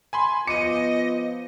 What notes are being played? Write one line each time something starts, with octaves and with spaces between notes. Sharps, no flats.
G#5 B5 C6
F3 B3 F4 D#5 D6 C#7 D#7